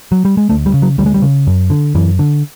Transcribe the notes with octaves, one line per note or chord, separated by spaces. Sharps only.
F#3
G3
G#3
D2 A3
G3
C#3
F#3
D2 G3
G#3
G3
C#3
F#2
D3
F#2 E3
D3